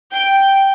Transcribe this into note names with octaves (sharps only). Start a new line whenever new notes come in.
G5